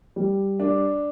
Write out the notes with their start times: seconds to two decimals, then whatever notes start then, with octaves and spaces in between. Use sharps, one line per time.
0.16 G3
0.60 D4